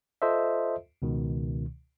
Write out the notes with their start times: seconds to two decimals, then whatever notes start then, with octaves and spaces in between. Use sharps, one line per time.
0.22 F4 A4 C5 D#5 E5
1.02 C#2 B2 D#3